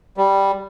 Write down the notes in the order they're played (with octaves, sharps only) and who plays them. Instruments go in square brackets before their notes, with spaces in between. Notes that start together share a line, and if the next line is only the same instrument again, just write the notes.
[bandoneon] G3